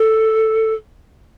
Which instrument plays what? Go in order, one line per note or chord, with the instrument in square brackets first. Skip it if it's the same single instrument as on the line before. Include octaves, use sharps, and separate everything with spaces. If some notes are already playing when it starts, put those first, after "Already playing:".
Already playing: [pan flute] A4